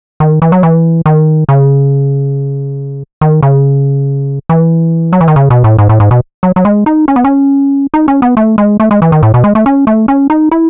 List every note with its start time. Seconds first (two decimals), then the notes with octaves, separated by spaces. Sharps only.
0.20 D#3
0.42 E3
0.52 F#3
0.63 E3
1.06 D#3
1.49 C#3
3.21 D#3
3.43 C#3
4.49 E3
5.13 F#3
5.21 E3
5.28 D#3
5.36 C#3
5.50 B2
5.64 A2
5.78 G#2
5.89 A2
6.00 G#2
6.11 B2
6.43 F#3
6.56 F#3
6.65 G#3
6.86 D#4
7.08 C#4
7.16 B3
7.24 C#4
7.94 D#4
8.08 C#4
8.22 B3
8.37 A3
8.58 G#3
8.80 A3
8.91 G#3
9.02 E3
9.12 D#3
9.23 A2
9.34 B2
9.44 G#3
9.55 A3
9.66 C#4
9.87 A3
10.08 C#4
10.30 D#4
10.52 E4